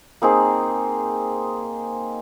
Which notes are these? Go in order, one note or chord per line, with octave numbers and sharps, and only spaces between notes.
A#3 C4 D#4 G#4